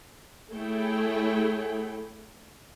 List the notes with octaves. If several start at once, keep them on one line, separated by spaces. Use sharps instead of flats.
A3 E4 G#4 A4 C#5 G5